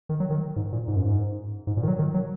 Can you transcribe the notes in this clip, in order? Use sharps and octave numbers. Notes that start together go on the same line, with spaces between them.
D#3
F#3
D#3
G#2
A#2
G#2
F#2
G#2
G#2
A#2
D#3
F#3
D#3
F#3